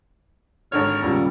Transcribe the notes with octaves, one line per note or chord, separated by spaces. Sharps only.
G#1 D3 C#5 F6
D#2 A#2 C#3 G3